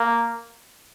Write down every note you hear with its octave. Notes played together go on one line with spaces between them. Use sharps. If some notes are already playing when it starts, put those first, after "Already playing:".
Already playing: A#3